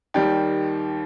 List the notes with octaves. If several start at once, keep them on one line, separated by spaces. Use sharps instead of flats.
D#2 D#3 G3 G4